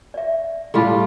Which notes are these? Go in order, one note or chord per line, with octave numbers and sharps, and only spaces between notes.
D5 E5
A2 G3 F4 G#4 A5